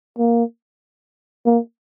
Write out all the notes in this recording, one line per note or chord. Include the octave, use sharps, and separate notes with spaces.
A#3
A#3